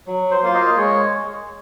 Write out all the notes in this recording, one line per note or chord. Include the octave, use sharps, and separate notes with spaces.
F#3
C5
A#3 F4 F5
D#5
G#3 C#5